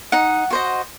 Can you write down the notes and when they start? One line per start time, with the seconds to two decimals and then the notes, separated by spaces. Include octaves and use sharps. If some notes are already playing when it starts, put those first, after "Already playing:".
0.12 D#4 F#5
0.50 F#4 C5 D#5